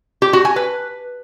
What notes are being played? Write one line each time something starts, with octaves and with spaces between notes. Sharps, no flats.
G4
F#4
G#5
B4